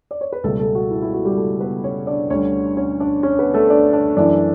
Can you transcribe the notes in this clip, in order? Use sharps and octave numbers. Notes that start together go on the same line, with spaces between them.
D5
C#5
B4
C#2 B2 G3 A3 A4
A3 A4
F#4
E4
E4
F#4
G3 G4
A3 A4
B3 B4
C#4 C#5
D4 D5
D2 D3 G3 C#4 C#5
C#4 C#5
D4 D5
C#4 C#5
B3 B4
A3 A4
D4 D5
D4 D5
F#2 E3 A3 D4 D5